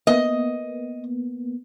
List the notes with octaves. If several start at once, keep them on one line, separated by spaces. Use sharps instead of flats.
A#3 B3 D#5